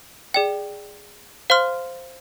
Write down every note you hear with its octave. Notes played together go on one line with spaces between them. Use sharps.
G#4 D5 G5
C5 F5 C6 F6